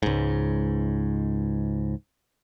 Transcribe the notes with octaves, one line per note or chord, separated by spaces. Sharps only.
C#2 G#2